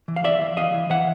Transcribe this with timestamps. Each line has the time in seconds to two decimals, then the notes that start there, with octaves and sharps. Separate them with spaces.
0.08 E3
0.16 F5
0.24 E3 D5 E5
0.41 E3
0.57 E3 D#5 F5
0.74 E3
0.90 E3 E5 F#5